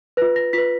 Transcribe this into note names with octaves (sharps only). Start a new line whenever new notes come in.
F4 B4 A#6
A#6
F4 B4 B6